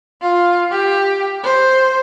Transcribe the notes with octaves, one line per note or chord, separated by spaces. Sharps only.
F4
G4
C5